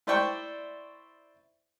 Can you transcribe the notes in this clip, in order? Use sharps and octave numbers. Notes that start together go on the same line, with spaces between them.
E4 C5 D5 E5 G5 C#6